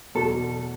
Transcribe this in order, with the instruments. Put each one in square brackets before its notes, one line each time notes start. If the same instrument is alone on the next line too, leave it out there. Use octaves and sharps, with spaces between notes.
[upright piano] E2 B2 F#3 [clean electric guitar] A4